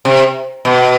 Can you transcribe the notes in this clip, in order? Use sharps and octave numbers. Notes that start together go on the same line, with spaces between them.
C3
B2